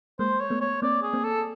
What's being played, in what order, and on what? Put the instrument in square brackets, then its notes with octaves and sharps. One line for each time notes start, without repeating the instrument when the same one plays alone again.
[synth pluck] G#3 A#3 [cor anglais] C5
[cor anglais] C#5
[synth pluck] A3 B3
[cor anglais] C#5
[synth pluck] A#3 C4 [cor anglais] D5
[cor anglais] G#4
[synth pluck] A#3 C4
[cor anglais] A4